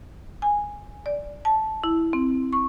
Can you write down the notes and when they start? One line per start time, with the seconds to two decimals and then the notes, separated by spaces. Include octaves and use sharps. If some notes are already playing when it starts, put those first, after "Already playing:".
0.42 G#5
1.06 D5
1.45 A5
1.84 E4
2.13 C4
2.53 C#6